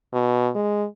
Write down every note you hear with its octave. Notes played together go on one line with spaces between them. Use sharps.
B2
G#3